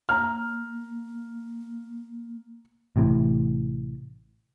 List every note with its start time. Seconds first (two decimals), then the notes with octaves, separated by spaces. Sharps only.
0.09 A#3 A#5 F6
2.96 A1 A2 C3 E3